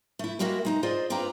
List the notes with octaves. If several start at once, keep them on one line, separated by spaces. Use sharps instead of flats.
A3 E4
G3 G#3 A#3 F#4 A#4 E5
G#3 D#4 A#5
F4 G#4 C5 D5 D#5
G2 C4 F4 B4 D5 A#5